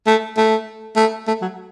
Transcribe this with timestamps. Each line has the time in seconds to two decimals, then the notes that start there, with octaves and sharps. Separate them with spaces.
0.07 A3
0.37 A3
0.96 A3
1.28 A3
1.42 F#3